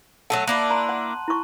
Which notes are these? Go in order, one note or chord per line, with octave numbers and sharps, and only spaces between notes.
F#3 A3 A4 F#5 D#7
A#3 D4 E4 A5 F#6 F#7
A#5 C6
F#5
E4 C#6